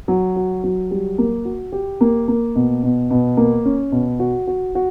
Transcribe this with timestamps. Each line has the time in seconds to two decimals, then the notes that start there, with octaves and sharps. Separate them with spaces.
0.08 F#3
0.36 F#4
0.64 F#3
0.91 G3
1.18 A#3
1.45 F#4
1.72 G4
2.01 A#3
2.28 A#3
2.55 B2
2.83 B2
3.10 B2
3.37 A#3
3.65 C#4
3.92 B2
4.20 F#4
4.47 F#4
4.75 F#4